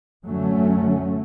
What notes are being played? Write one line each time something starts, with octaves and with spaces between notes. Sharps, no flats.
F#2 D3 F#3 A3 C#4